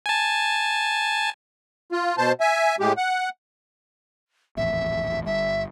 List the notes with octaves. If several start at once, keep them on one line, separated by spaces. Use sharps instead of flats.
G#5 A5
F4
B2 C5 A5
E5 G#5
A2 G#3 G4
F#5
D#1 A1 F2 E5
G1 G2 E5